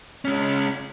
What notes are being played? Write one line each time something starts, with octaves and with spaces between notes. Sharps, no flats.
G#3 C#4